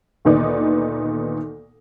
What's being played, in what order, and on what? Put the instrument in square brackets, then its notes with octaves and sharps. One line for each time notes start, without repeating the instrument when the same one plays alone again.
[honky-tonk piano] D2 A#2 D#3 B3 D#4 D5